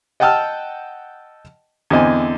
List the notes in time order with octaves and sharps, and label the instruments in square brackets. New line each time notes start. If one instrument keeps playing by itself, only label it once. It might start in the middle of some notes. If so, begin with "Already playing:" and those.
[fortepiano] D#5 F#5 G5 A5 E6 F6
E2 D3 C4 D#5 G#5